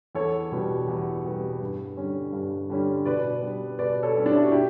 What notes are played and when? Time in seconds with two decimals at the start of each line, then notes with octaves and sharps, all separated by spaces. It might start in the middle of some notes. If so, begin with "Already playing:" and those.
0.15 E2 A4 C#5
0.52 B2 G3 B3
0.88 E2
1.24 B2 G3 B3
1.61 G2
1.97 D3 G3 C#4
2.33 G2
2.70 D3 G3 C#4
3.05 B2 B4 D5
3.42 G3 B3
3.79 B2 B4 D5
4.03 A4 C#5
4.15 G3 B3 C#4
4.26 D4
4.34 E4
4.43 F#4
4.52 B2 E4 G4